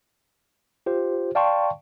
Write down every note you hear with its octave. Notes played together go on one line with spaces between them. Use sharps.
F4 G4 C5
D5 F5 G5 A5 C6 C#6